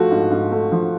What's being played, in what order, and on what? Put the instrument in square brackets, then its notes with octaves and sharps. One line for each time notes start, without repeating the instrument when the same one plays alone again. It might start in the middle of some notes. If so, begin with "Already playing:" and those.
Already playing: [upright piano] F3 A3 [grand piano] F#4
[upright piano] G#2
G#2
A3
F3